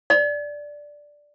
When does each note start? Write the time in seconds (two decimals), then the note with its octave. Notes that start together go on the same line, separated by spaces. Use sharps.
0.10 D5